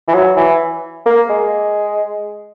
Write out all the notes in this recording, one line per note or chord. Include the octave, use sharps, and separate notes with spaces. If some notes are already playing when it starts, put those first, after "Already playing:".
E3
F#3
E3
A#3
G#3